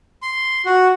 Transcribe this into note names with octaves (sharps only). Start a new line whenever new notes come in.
C6
F#4